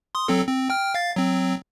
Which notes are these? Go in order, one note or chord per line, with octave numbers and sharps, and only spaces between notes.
C6 D#6
F#3 C4 A4
C4
G5 F6
F5 A6
F#3 C4